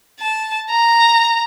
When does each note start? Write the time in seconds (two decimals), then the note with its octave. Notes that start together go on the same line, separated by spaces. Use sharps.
0.20 A5
0.70 A#5